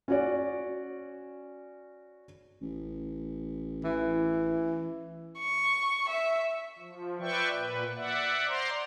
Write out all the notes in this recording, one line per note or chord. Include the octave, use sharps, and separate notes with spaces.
C#4 F#4 D5
A1
E3
C#6
E5
F3
B4 D5 E5 G5 C#6
A#2 B4
D5 E5 F#5
C5 D5 A#5 C6